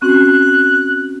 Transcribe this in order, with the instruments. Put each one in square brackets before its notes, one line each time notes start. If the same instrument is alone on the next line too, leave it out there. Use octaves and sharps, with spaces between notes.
[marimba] C4 C#4 F#4 [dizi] F#6